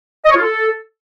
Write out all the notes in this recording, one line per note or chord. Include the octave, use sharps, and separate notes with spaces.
D#5
C#5
F4
A4